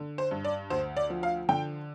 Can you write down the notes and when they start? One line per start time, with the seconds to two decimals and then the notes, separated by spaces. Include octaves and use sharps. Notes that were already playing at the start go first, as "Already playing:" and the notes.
Already playing: D3
0.18 C5
0.31 G2
0.45 D5
0.70 D2 C5
0.97 D5
1.10 F3
1.23 F5
1.49 D3 G5